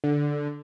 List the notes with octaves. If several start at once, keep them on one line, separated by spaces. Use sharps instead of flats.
D3